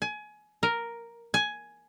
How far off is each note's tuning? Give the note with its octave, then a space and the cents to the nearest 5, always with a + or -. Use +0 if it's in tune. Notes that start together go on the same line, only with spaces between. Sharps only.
G#5 +25
A#4 +0
G#5 +10